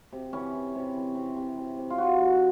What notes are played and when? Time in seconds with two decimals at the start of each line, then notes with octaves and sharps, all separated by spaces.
0.12 C3
0.33 E3 C#4
0.54 E3
0.75 C3
0.95 E3
1.15 C3
1.36 C3
1.58 C3
1.77 C3
1.90 F4
1.98 F#3 F#4
2.19 F#3